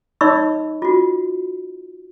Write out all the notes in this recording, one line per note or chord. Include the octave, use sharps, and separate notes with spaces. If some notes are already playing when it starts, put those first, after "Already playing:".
D#4 C#5 D#5 B5 C#6 E6
F4 F#4